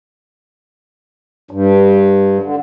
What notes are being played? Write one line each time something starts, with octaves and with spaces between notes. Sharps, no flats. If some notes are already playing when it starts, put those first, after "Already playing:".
G2
D3